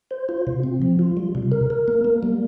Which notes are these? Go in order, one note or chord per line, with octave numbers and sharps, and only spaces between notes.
C5
F4
C3
C4
F3
F4
G3
C3
A#4
A#4
A#3
A#3
G3